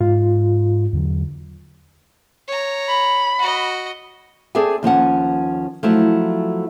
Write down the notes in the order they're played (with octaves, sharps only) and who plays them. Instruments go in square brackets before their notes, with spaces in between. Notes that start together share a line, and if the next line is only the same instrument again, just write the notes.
[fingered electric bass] G#2 [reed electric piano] F4
[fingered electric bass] E2 D3 F#3
[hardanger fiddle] C#5 A#5
[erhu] B5
[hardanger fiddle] F#4 D#5
[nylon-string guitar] C4 G#4 A4 D5 E5 G#5
D#2 F3 C#4 F#5
F3 F#3 A3 E4